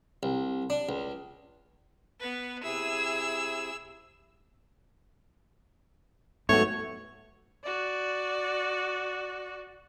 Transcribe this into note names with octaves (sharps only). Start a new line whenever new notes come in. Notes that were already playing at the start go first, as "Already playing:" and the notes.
C2
D4
C#2
B3 B4
C3 E4 G#4 E6
G#2 F#3 A3 B3 F#4 C#5
F#4 D5